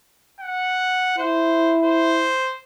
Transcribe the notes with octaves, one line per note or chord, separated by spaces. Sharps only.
F#5
E4 C5
C5